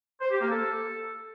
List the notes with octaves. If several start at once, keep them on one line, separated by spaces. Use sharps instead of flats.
C5
G4
A#3
A4